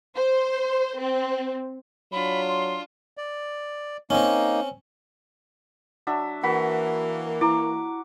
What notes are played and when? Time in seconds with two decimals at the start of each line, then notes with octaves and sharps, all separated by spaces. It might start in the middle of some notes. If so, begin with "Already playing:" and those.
0.16 C5
0.98 C4
2.12 F#3 D4 F4 B5
2.49 C6
3.17 D5
4.10 A#3 C4 C#4 D#4
6.07 F#3 D4 E5
6.43 E3 A#3 F#4 F#5 B5 B6
7.41 E4 A#5 D6